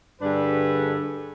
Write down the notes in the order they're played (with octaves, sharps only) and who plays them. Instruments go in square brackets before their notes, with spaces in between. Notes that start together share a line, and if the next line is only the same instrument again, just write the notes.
[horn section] G2 D3 D4 G#4 A4 B4